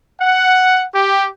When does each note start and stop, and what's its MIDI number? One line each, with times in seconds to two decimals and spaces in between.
0.22 0.85 78
0.93 1.28 67